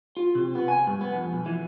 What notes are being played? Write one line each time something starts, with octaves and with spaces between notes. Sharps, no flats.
F4
C3
B3
G#5
G2
B3
F2
B1
E3